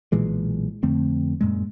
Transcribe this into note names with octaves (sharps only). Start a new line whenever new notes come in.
B1 A#2 E3 G#3
F2 D3 A3 C4
F#2 A#2 G#3